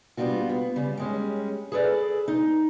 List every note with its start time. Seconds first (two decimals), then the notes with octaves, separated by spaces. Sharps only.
0.17 G3 B3 D4 F4 F#4
0.49 B3
0.76 C#3 G3
0.98 G3 G#3 C#4
1.72 G#4 A4 B4 D5
2.28 D#4